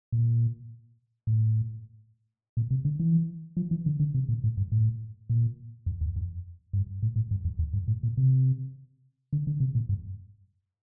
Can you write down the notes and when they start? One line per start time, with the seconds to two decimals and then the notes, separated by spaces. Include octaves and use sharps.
0.12 A#2
1.27 A2
2.57 A#2
2.71 C3
2.85 D3
3.00 E3
3.57 F3
3.71 E3
3.86 D3
4.00 D3
4.14 C3
4.29 A#2
4.44 A2
4.57 G2
4.72 A2
5.30 A#2
5.86 F2
6.01 E2
6.16 F2
6.73 G2
7.03 A2
7.16 A2
7.31 G2
7.45 F2
7.59 E2
7.73 G2
7.88 A2
8.03 A#2
8.17 C3
9.33 D3
9.47 D3
9.60 C3
9.75 A#2
9.89 G2